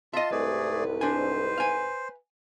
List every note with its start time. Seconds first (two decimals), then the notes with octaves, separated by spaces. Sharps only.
0.14 F4 D#5 E5 A5 C6
0.31 C2 G#2 A3 G#4 B4 D5
1.01 D4 C5 G#5
1.58 F5 G#5